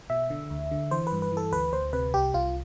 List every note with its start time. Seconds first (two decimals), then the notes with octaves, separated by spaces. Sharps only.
0.10 B2 E5
0.30 D3
0.50 D2
0.71 D3
0.91 E3 C5
1.07 B4
1.12 G2
1.22 B4
1.32 E3 A4
1.52 D2 B4
1.73 D2 C5
1.93 C3 B4
2.14 C2 G4
2.34 C2 F4